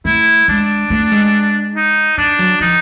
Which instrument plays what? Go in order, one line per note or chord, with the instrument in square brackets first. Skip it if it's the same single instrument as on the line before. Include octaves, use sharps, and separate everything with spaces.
[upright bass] A3 [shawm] E4
[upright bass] G#3 [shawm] D4
[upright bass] A3
G#3
[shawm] D#4
[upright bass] G3 [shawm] D4
[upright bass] F#3
[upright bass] F3 [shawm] D#4